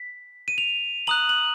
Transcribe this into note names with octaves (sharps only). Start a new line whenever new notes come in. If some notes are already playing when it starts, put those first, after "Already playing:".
Already playing: B6
D#7
F7
A#5 D#6 F#6 F#7
F#7